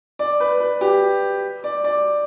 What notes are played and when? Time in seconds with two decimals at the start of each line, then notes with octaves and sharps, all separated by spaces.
0.19 D5
0.40 B4
0.60 B4
0.81 G4
1.64 D5
1.84 D5